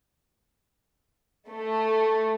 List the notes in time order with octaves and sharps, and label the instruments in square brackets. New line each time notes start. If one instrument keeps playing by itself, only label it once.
[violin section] A3